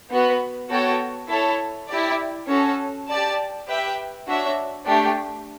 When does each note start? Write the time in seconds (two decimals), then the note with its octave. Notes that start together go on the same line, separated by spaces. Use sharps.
0.10 B3 F#4 B4
0.70 B3 F#4 A4 C#5 G5
1.29 E4 A4 C#5
1.88 E4 G4 D5
2.48 C#4 F#4 A4
3.08 G4 D5 A5
3.67 G4 B4 E5 G5
4.27 D4 F#4 C#5 E5
4.86 A3 D4 G4